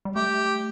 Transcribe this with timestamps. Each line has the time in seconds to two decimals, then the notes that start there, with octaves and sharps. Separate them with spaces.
0.05 G3
0.16 A3 G4